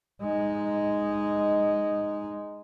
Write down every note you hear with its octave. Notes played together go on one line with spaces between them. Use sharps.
G#3 D#4